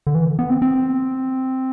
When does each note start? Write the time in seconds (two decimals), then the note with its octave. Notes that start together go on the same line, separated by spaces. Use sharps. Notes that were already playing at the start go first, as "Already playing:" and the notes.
0.07 D3
0.15 E3
0.39 B3
0.50 C4
0.62 C4